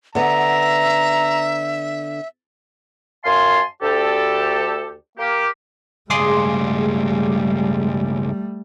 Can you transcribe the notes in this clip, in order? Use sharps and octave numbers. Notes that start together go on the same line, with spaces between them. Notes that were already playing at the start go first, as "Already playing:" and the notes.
D3 B3 E5 A#5
F#2 F5 G#5 A5 C6
D2 G4 A4
A#3 G4
C#2 G2 G3 A3 G#4 C6 D6